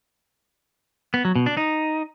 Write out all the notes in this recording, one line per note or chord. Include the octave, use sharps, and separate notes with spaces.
B3
F#3
B2
D4
D#4